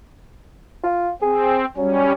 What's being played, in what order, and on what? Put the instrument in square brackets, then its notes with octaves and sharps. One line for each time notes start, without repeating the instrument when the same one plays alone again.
[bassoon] F4
[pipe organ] C4 [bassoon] G#4
[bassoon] F#3 [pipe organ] G3 C#4